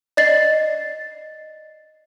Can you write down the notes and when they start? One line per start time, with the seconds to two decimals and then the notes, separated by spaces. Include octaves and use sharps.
0.17 D5 D#5 A6 C7